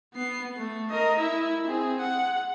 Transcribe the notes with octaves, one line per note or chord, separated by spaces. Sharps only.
B3 C7
A3
A#4 D#5
E4 E5
C4 G#4
F#5